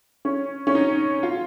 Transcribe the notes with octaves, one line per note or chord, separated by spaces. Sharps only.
C#4
C#4
D#4
F4